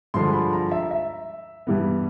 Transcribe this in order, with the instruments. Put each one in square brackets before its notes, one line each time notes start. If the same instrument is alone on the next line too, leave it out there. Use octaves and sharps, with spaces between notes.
[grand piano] G2 D3 F3 G#3 C6
B5
A#5
E5
E5
G2 E3 G3 B3